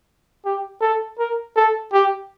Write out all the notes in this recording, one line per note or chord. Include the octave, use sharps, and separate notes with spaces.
G4
A4
A#4
A4
G4